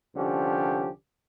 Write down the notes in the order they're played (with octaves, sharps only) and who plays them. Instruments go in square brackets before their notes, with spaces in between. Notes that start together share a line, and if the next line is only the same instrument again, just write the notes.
[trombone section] C2 D3 F3 C#4 G4